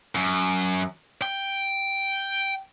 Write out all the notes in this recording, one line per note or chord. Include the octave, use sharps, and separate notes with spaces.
F#2
G5